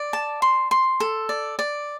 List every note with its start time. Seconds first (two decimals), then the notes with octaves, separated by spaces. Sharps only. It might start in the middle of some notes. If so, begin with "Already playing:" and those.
Already playing: D5
0.13 A5
0.42 C6
0.71 C6
1.00 A4
1.29 D5
1.59 D5